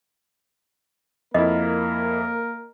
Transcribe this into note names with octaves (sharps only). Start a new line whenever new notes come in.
F2 A#3 E4 A#4 D#5